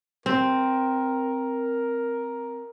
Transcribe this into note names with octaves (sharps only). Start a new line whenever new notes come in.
C4 A#4